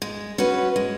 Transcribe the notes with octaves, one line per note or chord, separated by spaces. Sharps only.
G#3
C#4 F#4 B4
G#3